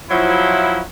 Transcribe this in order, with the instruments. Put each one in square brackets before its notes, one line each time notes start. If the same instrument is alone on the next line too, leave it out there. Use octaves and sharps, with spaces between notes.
[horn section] F3 F#3 E4